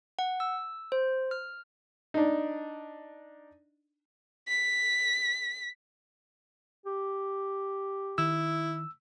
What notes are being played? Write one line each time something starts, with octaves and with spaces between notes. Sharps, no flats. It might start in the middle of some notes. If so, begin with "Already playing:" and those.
F#5
E6
C5
F6
D4 D#4
B6
G4
D#3 E4 E6